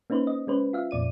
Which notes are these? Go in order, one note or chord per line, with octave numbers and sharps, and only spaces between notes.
A#3 C#4 D#4 B4 C5
D#5
G#3 C#4 B4 C5
F4 E5 F5
F2 A#2 D5 D#7